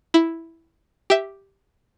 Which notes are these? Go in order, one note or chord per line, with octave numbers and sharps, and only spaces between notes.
E4
G4 E5